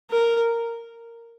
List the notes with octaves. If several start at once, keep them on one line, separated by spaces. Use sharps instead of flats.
A#4